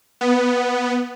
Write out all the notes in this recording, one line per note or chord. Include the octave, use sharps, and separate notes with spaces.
B3